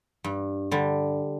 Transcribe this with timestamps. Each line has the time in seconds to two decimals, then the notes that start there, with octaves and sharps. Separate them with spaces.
0.24 G2
0.71 D3 G3